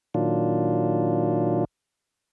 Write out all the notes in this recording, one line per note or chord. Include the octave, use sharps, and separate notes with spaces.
A#2 D#3 F#3 D4 F4